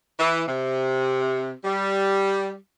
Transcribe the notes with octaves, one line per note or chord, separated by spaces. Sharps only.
E3
C3
G3